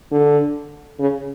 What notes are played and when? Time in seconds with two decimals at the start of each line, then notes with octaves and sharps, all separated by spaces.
0.12 D3
0.99 C#3